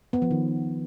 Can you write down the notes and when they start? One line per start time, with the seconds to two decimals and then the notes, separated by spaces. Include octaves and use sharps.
0.13 B3
0.22 F3
0.31 D#3